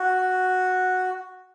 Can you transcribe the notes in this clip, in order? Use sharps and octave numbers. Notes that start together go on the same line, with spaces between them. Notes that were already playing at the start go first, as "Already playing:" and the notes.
Already playing: F#4